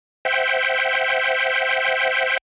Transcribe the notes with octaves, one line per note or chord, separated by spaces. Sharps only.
C5 E5 F#5 G5